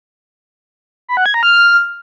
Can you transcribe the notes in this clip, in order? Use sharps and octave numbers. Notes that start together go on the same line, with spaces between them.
B5
F#5
G#6
A#5
F6